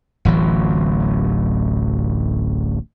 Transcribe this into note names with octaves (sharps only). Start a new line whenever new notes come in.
D1 A1 E3 F#3